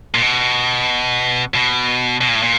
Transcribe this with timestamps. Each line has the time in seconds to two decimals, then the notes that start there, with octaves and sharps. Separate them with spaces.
0.14 A#2
0.22 B2
1.55 B2
2.21 B2
2.28 A#2
2.35 A2
2.43 A#2